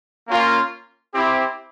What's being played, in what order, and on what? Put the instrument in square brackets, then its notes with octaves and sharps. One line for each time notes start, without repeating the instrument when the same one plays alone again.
[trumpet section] A#3 C#4 F4
C4 E4 G4